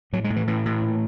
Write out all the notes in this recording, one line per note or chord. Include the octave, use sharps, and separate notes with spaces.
A2 F#3
G#3
A2
E3
A2 E3
A2
A#2